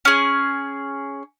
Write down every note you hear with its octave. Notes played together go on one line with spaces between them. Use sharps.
C#4 G#4